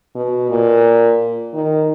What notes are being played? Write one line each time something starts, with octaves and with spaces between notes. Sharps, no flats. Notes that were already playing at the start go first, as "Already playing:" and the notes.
B2
A#2
D#3